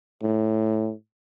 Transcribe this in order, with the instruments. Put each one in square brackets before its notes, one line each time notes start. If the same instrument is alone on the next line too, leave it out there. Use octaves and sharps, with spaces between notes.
[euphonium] A2